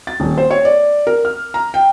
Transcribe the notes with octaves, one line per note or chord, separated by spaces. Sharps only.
A6
D#1
C5
C#5
D5
A#4
F6
A#5
G5